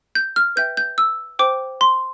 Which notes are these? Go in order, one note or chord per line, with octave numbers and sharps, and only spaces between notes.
G6
F6
B4 E5 G5 G6
G6
E6
C5 G5 D6
C6